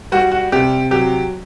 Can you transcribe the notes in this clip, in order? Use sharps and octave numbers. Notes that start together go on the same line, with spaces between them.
G3 F#4
F#4
C3 G4
F#3 G4